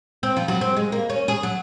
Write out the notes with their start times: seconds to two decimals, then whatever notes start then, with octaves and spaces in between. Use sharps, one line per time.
0.23 C4
0.37 F3
0.48 F#3
0.61 C4
0.77 G#3
0.92 A#3
1.10 C#4
1.28 G#4
1.43 F#3